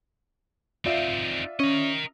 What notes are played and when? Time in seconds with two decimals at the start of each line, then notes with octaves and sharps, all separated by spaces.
0.86 C4 D#4 F4 D5 E5
1.60 C#4 A#4 D#5